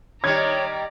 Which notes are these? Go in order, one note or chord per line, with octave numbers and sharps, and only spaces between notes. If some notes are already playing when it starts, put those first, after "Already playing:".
D#3 G3 C#5 D5 A#5 G#6